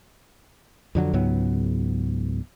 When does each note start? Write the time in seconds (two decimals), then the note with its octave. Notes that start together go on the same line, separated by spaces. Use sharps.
0.95 F2 D3 F#3
1.13 C#2 G#2 F#3 B3